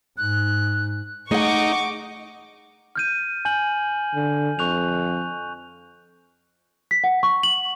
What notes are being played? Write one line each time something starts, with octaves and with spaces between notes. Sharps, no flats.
G#2 D#4 F#6
A3 D#4 G#4 F#5 C#6 D6
F6 G6 D#7
G#5 G6 F#7
D3
F2 C#6 F#6 F7
B6
F#5
C#6
F#7